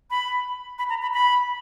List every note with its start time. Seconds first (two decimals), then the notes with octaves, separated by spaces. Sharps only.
0.11 B5
0.79 B5
0.90 A#5
1.02 B5
1.14 B5